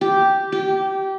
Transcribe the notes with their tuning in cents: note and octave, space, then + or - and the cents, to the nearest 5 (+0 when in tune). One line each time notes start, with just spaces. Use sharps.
G4 -5
G4 -20